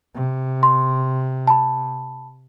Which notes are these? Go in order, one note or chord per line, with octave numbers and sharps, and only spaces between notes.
C3
C6
A5 B5